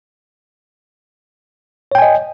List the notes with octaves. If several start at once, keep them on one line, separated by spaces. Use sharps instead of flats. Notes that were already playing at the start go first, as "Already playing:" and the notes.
C#5 D#5 G5 G#5